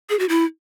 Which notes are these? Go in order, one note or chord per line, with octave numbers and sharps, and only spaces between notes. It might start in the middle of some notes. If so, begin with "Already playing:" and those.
G#4
F#4
E4